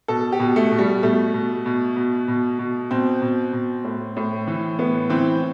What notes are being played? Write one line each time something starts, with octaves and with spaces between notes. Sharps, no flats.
B2 A4
G4
B2
A3
B2
G3
B2 A3
B2
B2
B2
B2
B2
B2 C4
B2
B2
A2
A2
E3
A2 B3
E3 C4